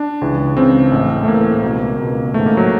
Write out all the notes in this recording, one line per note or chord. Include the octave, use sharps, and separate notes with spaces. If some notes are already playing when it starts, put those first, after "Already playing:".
Already playing: D4
C#2 C#3 E3
C#2 C#3 E3 C4
A1 A2 E3
A3
A1 A2 E3 A#3
C#2 B2
C#2 B2
A1 G#2 D#3 A3
A#3
F#3